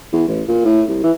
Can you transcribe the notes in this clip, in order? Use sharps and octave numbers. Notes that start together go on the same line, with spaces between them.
E2
A1
A#2
A2
C2
E3